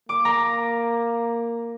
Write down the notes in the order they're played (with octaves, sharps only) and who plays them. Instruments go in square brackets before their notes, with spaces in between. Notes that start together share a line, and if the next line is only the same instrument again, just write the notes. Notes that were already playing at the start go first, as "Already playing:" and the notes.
[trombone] A#3 [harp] D6
[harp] A#5